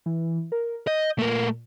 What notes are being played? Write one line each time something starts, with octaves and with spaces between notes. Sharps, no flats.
E3
A#4
D#5 G6
A#2 A3 A#4